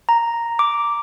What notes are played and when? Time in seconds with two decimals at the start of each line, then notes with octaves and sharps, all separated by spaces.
0.09 A#5
0.59 D6